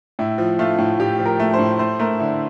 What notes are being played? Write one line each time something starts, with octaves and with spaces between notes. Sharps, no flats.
A2 E4
F3
A3 F4
A2
A2 G4
F3
A#4
A3
C5
A2
A3 C5
A3 A#4
D3 E4